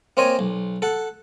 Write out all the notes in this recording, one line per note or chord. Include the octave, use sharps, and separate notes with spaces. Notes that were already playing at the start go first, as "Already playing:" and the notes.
A#3 C4 C5 C#5 D#5 G#5
B1
A4 F#5